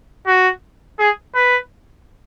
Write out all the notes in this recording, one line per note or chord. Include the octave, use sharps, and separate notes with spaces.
F#4
G#4
B4